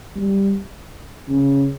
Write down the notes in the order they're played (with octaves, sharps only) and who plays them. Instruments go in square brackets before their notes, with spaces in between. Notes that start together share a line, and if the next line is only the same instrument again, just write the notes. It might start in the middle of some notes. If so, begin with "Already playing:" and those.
[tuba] G3
C#3